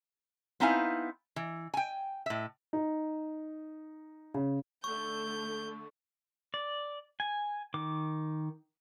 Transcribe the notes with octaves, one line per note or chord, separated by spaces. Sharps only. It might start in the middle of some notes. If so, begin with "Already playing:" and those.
B3 C4 D#4 E4 F5 G#5
E3
G5 G#5
A2 E5
D#4
C#3
D3 A3 C#6 G6
D5
G#5
D#3 D6